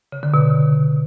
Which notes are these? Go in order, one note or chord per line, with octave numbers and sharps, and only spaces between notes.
C#3
D3
B2